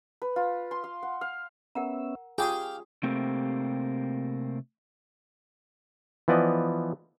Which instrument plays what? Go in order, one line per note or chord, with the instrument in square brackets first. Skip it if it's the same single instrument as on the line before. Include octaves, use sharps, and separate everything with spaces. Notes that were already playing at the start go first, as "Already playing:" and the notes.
[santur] B4
F4
C6
F5
F#5
F5
[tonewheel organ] B3 C#4 E5 [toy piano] A#4 F#5 A#5
[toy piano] F4 C#6 [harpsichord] G4 G5 [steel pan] G#4 [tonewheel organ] F5
[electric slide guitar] C3 A3 A#3 C4 G4
[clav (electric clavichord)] E3 F3 B3 D5 D#5